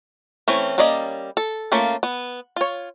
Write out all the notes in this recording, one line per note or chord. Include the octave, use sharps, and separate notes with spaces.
E3 A3 C4 C#4
G3 A#3 C#4 D5 D#5
A4
A3 A#3 C#4 F4
B3
F4 C#5